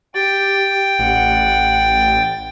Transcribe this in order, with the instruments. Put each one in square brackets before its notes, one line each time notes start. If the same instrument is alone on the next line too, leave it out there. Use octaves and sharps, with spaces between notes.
[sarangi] G4 [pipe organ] G5 A6
[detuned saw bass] A1 [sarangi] F#5